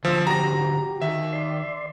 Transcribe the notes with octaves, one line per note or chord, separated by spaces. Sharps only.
D2 A#2 F3 E6
F#4 G4 A#5 A#6
D#2 E5
D5 C6